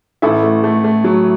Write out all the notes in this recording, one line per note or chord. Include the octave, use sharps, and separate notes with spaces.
A1 E4 A4
A3
A3
A3
F#3